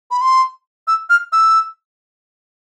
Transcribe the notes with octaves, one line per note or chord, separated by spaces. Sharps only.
B5
C6
E6
F6
E6